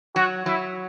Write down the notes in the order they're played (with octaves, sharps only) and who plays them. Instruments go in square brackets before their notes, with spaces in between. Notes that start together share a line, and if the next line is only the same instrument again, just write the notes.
[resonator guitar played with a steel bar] F#3 [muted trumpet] F#4
[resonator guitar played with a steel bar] F#3 [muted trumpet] E4